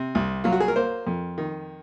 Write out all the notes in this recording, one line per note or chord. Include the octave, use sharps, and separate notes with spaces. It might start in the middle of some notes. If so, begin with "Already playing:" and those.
Already playing: C3
C2
F#3 F4
F#4
G#4
A#4
A#3 C5
F2
D#3